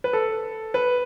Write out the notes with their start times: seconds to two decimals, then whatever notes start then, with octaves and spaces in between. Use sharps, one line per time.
0.04 B4
0.13 A4
0.74 B4